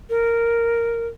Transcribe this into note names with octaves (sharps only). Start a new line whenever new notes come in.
A#4